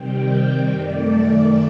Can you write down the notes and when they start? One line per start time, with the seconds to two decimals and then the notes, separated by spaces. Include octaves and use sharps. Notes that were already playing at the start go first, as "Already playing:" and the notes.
Already playing: C3 D#3 G3 C4 G5
0.69 F#2 D#3 A3 D5